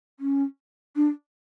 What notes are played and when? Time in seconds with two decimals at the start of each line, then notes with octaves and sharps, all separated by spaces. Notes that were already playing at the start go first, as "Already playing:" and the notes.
0.20 C#4
0.96 D4